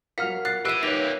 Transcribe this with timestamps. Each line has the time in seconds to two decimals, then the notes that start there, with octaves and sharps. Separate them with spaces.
0.18 F#3 F4 A#4 F5 F#5 F6 B6
0.45 F#6 A6 C7
0.65 G4 B4 E5 E6 F#6 C7 D7 D#7
0.83 G3 A#3 D#4 B4 C#5 E5 A#6 F7